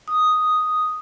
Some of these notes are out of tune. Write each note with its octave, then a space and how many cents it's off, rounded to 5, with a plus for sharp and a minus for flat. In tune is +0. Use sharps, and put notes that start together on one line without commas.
D#6 +0